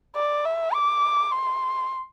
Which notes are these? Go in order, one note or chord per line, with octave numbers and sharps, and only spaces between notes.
D5
E5
D6
C6